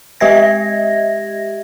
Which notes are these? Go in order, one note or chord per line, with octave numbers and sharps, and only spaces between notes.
G#3 G4 D#5 E5 G#6 A#6